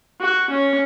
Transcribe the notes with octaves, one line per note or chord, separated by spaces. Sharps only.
F#4
C#4